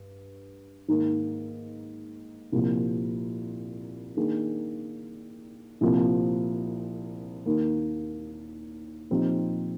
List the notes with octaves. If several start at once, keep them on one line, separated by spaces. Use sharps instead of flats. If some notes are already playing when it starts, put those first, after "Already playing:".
Already playing: G2
G#2 D#3 A#3
C2 A#2 F3
D#3 A#3 D4 G#4
C2 A#2 F3 C4
D#2 D#3 A#3
A#2 F3 C4 D#4 G4